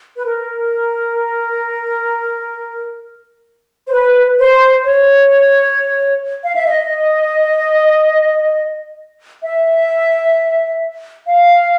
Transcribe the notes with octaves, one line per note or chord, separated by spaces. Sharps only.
B4
A#4
C5
B4
C5
C#5
F5
E5
D#5
E5
F5